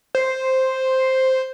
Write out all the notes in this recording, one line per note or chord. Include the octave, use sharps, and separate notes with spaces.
C5